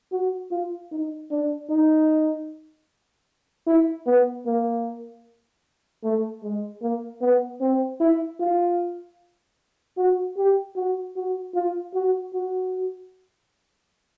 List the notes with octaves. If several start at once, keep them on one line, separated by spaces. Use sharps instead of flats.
F#4
F4
D#4
D4
D#4
E4
B3
A#3
A3
G#3
A#3
B3
C4
E4
F4
F#4
G4
F#4
F#4
F4
F#4
F#4